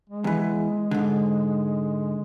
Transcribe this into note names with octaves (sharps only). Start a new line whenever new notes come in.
G#3
E2 E3
G#2 D3